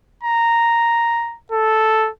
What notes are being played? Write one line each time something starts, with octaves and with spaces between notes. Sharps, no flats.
A#5
A4